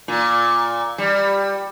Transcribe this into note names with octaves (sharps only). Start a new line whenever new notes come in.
A#2
G3